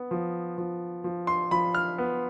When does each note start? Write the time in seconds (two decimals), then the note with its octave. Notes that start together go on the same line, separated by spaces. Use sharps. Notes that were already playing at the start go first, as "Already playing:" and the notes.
Already playing: B3
0.11 F3
0.58 F3
1.04 F3
1.27 C6
1.51 F3 B5
1.75 F6
1.98 B3